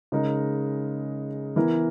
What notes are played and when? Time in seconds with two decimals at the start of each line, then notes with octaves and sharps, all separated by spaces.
0.12 C#3 G#3 D#4 A#4
1.56 E3 B3 E4 A#4